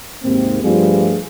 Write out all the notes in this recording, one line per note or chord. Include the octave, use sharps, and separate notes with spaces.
D#2 G#2 C3 A#3 C4
G2 F3 G3 A3 F4 G#4